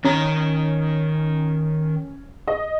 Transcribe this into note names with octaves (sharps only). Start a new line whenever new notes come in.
D#3 C#4 A#5
D#5